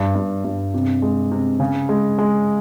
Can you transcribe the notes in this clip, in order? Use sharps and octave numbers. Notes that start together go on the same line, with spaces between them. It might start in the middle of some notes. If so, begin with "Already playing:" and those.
Already playing: G2
G2
G2
C3
G#3
C3
C#3
G#3
G#3